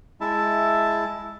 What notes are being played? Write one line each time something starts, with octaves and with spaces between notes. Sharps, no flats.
G#3 E4 E5 A5